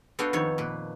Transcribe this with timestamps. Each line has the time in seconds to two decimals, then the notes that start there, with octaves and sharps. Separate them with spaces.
0.19 B3 D4 F#4 A4 F5 G5
0.33 F2 D#3 A4 C#5
0.58 A#2 B4